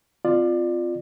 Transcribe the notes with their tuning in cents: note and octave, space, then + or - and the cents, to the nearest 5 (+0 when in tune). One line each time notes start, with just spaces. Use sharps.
C4 -30 F4 +0 D5 +25